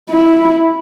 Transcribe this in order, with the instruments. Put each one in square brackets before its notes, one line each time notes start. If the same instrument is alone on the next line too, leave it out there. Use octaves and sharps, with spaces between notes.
[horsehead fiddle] E4